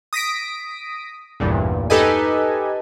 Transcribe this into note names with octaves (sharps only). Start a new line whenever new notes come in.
D#6 A#6 B6 D7
A1 E2 G2 A#2
D#4 G4 A4 B4 D#5 G#5